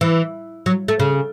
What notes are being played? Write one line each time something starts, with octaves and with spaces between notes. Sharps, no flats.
E3
F#3
A3
C#3